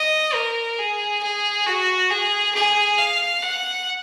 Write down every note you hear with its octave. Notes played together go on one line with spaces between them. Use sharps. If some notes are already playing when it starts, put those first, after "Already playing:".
Already playing: D#5
A#4
G#4
G#4
F#4
G#4
G#4
F5
F#5